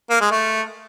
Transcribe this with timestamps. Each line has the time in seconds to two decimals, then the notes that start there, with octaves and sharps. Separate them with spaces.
0.10 A#3
0.21 G#3
0.31 A3